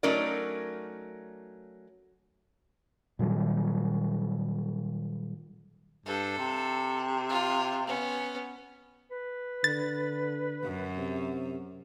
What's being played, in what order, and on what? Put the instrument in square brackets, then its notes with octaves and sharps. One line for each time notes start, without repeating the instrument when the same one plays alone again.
[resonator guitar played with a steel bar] F#3 A3 C#4 D#4 A#4 D5
[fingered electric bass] A#2 D#3 F#3 G3
[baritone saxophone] G2 [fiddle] A4
[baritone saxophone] C3
[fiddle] F4
B3 C#4
[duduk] B4
[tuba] D3 [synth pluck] A6
[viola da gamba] F#2
[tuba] C3